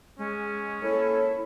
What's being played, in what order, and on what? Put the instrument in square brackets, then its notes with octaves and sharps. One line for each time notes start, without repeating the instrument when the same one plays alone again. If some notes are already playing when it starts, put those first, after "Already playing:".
[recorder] G#3 [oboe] C#4
[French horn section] A#3 A4 [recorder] E4 [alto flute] C#5